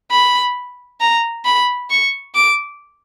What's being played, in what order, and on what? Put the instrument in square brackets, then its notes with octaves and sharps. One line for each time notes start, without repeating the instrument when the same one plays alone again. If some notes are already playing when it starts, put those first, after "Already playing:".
[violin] B5
A#5
B5
C#6
D6